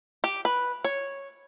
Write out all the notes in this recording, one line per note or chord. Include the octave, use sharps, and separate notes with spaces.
G4
B4
C#5